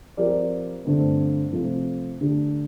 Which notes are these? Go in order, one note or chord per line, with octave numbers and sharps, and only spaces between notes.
F3 C4 G4 A#4 D5
G2 D3 A3 C4
C3 F3 A3 C4
D3 A3 D4 G4